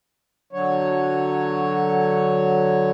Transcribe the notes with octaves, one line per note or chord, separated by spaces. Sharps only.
D3 F#3 C#5